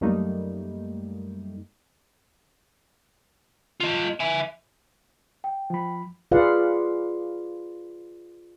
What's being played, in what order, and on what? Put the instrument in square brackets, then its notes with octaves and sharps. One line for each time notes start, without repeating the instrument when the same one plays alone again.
[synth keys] F#2 G3 A3 A#3 D#4
[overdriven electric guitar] F4 D#5
E5 G#5
[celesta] G5
[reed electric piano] F3 B5
[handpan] F4 G#4 B4 D5 F5 F#5